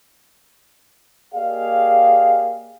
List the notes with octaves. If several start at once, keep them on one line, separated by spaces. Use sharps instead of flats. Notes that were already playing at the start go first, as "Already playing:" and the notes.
A#3 G4 G#4 D5 D#5 F5